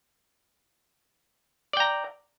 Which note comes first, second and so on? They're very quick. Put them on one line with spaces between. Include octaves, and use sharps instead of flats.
D5 G5 A#5